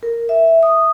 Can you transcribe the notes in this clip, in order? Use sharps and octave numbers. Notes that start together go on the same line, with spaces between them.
A#4
E5
D#6